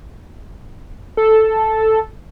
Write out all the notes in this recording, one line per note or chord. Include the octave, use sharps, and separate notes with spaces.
A4